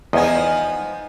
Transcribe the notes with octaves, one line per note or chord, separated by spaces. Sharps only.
E2 F3 B3 D#4 D#5 G#5